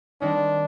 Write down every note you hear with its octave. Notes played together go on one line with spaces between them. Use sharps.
D#3 G3 C4 D4 D#4